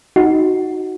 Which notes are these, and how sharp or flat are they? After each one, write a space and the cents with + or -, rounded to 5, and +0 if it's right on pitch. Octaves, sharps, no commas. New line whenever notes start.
D#4 +10 F#4 +0